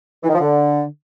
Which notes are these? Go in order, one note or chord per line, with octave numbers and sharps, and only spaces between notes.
E3
D#3
F3
D3